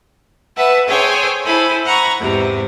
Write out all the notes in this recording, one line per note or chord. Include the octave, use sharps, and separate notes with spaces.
B4 E5 F#5 A5
G#4 A4 C5 C#5 G5 G#5
E4 A4 C5 G#5 B5
F#5 A#5 B5 C#6
E2 G#2 C3